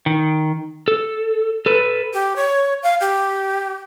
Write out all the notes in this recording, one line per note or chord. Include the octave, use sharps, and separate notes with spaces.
D#3
A4
A4 B4
G4
C#5
F5
G4